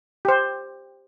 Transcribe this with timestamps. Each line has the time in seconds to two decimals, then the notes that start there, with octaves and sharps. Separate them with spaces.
0.25 G4 C5